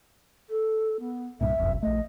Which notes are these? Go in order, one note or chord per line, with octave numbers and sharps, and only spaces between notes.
A4
B3
C2 G2 A#2 E5
F#1 B1 F2
A#1 A3 D#5